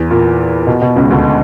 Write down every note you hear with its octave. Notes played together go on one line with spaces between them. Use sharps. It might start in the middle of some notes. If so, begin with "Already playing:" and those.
Already playing: E2 E3
A#2
B2
B2
C#2 C#3
D2 D3